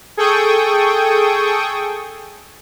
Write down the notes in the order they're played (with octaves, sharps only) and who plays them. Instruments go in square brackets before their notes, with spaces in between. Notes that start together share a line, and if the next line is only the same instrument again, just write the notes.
[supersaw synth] G#4 A4 G5 C#6 D#6